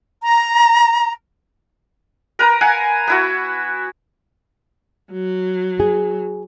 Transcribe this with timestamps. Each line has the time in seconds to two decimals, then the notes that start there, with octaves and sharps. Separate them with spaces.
0.22 A#5
2.39 A#4 B4 A#5
2.61 F5 F#5 G#5
3.08 B3 E4 F#4
5.12 F#3
5.80 G#4